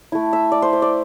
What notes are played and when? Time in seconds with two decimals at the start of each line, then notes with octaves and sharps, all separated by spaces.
0.12 A3 E4
0.33 E5
0.52 D5
0.62 C5
0.73 C5
0.82 D5